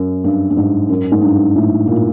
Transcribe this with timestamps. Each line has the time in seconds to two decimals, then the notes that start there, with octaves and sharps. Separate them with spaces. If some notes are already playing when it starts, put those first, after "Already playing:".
Already playing: F#2
0.24 G2
0.50 G2
0.57 G#2
0.89 F#2
1.12 G#2
1.22 G2
1.56 A2
1.87 A#2